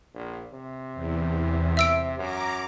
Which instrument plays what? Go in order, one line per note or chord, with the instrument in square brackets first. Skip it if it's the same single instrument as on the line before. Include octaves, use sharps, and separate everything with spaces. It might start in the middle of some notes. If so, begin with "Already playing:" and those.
[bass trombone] A#1
C3
[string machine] E2
[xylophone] E5 E6 D7
[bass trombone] F#2 [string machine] A#5 D6